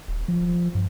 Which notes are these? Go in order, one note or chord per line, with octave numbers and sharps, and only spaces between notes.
D#1
F3
G2